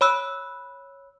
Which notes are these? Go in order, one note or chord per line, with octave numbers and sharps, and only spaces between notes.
C#5 B5 E6 F#6